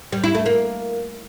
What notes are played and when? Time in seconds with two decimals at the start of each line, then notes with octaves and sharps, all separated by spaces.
0.12 G3
0.24 E4
0.35 A3
0.46 A#3